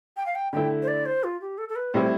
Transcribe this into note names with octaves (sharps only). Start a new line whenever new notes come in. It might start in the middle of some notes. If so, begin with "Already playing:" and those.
G5
F5
G5
D3 A3 E4 G5
C5
D5
C5
F4
G4
A4
A4
B4
A2 G3 C4 E4 C5